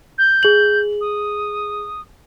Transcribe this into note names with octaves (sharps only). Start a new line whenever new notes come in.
G6
G#4 F#7
D#6